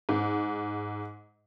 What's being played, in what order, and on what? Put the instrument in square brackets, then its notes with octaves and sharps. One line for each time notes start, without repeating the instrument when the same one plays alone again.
[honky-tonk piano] G#2